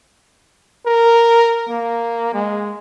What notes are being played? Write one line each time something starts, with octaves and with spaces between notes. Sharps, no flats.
A#4
A#3
G#3